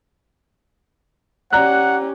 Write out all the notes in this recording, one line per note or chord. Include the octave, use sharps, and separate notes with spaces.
C#4 G4 D5 F#5 A#5 F#6